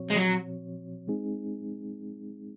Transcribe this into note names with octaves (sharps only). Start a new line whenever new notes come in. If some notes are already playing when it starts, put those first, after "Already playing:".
Already playing: A#2 F3 C4 F#4 C#5
G#3
F#3
G#3 C4 D#4 G#4